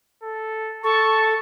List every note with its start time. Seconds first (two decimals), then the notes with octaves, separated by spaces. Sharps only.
0.23 A4
0.84 A4 A5 C#6